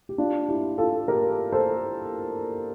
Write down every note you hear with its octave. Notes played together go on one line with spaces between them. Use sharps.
G4
D4 F4
E4 G4
F4 A4
G4 A#4
A4 C5